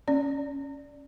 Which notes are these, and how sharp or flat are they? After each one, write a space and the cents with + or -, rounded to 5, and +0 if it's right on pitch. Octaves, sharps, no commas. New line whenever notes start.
C#4 +0 D5 +0